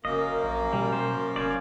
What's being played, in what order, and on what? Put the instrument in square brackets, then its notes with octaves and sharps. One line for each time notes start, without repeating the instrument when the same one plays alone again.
[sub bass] F#1 [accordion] F#2 A#3 [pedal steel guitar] D#5
[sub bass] A#1
[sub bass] B2 [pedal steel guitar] G3
[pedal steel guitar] C5
[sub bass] F1 [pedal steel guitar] C#4 C5 D5